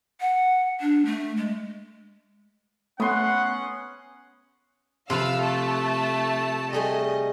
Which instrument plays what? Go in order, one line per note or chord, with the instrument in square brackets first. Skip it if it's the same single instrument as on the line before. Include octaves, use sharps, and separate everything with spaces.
[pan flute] F#5
D4
A3
G#3
[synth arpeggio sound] A3 [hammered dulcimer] B3 C6 [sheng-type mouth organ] C#4 [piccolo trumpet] F#5
[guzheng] C3 F3 B4 [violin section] F5 E6
[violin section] A3 A5
[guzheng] G3 A3 G#4 [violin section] D#5